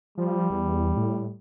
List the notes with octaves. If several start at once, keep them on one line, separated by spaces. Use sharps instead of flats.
F3 G3
E2
A2